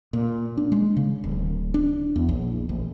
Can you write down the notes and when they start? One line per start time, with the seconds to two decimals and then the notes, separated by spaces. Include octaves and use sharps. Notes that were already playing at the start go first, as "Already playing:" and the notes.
0.13 A#2
0.57 D4
0.72 G#3
0.97 C#3
1.24 D1
1.74 D4
2.16 E2
2.29 A#1
2.69 A1